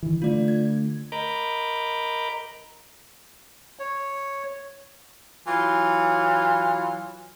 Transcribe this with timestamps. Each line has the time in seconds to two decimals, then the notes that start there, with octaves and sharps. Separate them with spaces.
0.03 D#3 E3
0.22 D3 A3 F4 D5
0.48 G#6
1.12 A#4 D#5 A#5 B5 D6 G6
3.79 C#5
5.46 E3 F#3 F4